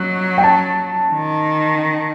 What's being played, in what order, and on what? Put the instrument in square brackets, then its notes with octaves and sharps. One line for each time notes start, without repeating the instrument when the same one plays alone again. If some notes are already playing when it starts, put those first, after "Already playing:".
Already playing: [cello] F#3 [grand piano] F#6
[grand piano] G5
A5
[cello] D#3